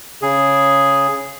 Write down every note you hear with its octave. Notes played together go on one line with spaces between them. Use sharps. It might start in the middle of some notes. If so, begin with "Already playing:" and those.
C#3 G#4